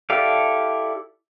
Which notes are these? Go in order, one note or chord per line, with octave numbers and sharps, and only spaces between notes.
E4 G4 A4 D5 F5